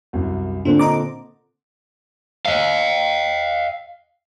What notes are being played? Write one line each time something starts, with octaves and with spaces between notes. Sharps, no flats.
C2 F#2
A#2 D3 C4 D4
D#5 A#5 D6
D#5 F5